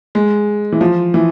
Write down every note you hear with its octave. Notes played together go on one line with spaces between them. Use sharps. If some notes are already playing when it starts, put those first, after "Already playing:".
G#3
E3
F3
E3